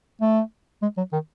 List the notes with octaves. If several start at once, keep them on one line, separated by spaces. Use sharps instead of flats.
A3
G#3
F#3
D#3